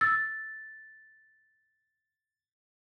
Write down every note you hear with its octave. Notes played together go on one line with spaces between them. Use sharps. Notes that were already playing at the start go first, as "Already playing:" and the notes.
E6 A6